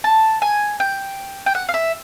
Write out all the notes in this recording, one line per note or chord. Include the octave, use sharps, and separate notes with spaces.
A5
G#5
G5
G5
F#5
F5
E5